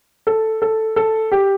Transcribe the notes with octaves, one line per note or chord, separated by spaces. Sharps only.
A4
A4
A4
G4